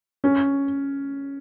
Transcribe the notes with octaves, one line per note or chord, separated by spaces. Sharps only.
C#4